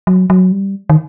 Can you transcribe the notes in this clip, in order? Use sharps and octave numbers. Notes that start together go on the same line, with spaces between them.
F#3
F#3
G3
D#3